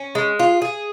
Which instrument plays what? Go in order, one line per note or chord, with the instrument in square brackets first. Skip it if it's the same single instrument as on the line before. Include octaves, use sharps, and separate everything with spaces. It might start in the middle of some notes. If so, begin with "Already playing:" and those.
Already playing: [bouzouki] C#4
G#3
F4
G#4